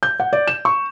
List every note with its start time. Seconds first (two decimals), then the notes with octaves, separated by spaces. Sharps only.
0.03 G6
0.20 F#5
0.33 D5
0.47 E7
0.65 C#6